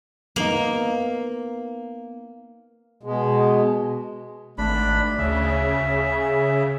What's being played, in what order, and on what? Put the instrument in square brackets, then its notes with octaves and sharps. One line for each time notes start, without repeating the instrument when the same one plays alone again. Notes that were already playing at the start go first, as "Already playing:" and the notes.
[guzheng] A#3 [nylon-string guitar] B3 D#4
[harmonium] B2 G#3
[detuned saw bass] G#1 [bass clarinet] A3 [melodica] D4 B5
[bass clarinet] D2 [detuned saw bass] C#3 [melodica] E5
[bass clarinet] G#4